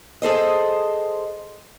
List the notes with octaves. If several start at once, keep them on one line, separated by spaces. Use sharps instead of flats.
G#4 A4 C5 D#5